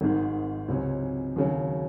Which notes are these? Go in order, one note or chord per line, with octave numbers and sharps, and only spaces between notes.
G#1 G#2 D#3
C#2 C3 F#3 C#4
D#2 C#3 F#3